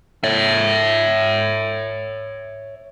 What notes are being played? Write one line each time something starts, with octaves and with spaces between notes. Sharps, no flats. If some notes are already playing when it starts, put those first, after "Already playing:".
C#5 E5